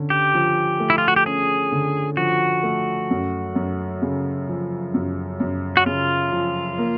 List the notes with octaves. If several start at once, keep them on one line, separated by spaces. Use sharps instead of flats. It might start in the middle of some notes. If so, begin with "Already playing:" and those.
Already playing: D3 C#4
G4
F3
A3
E4
F4
F#4
G4
C#4 G#4
D3
F3 F#4
A3
F#2
F#2
C#3
F3
F#2
F#2
F#4
C#3 F4
F3
A#3